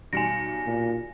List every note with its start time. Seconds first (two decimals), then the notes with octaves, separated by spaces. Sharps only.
0.13 B1 G3 G#5 A#6 C#7
0.65 A#2